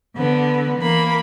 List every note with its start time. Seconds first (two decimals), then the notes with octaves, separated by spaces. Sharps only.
0.16 D3 B3
0.77 E3 A#3 B5